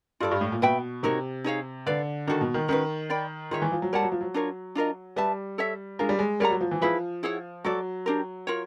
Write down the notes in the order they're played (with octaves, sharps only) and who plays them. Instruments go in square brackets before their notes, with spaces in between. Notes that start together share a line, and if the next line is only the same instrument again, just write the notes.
[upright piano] G2 [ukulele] F4 A4 D5
[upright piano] G2
A2
A#2
[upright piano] B2 [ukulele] B4 E5 G5 B5
[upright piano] C3 [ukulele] D#4 F#4 A#4 C#5
[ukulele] D#4 G#4 C#5 F5
[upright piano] D3 [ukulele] B4 D5 F5
[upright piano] D#3 [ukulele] D4 F#4 A4
[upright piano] B2
D#3
[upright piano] D#3 [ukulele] C#4 F#4 B4
[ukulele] A#4 D5 G5 B5
[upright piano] D#3 [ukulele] F4 G#4 C#5 E5
[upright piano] E3
F3
F#3
[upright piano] G3 [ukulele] A#4 C#5 F#5 A5
[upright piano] F#3
F3
F#3
[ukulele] D4 F4 A#4 C#5
D4 F4 A#4 D#5
[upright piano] G3 [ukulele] B4 E5 A5
[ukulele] A4 C#5 E5
[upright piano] G#3 [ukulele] D4 F4 A#4
[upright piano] G3
G#3
[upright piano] G3 [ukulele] A#4 C#5 F#5 A#5
[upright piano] F#3
F3
E3
[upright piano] F3 [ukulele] E4 G#4 B4 E5
[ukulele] E4 G#4 C#5 F#5
[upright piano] F#3 [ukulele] F#4 A4 D5
[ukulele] D4 G4 A#4
F4 A#4 C#5